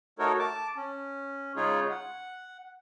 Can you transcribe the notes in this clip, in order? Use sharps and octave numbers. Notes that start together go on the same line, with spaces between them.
A3 D#4 F#4 A4 A#4 C#5
A5 D6
C#4
C#3 G#3 D#4 F4 G#4 C#5
F#5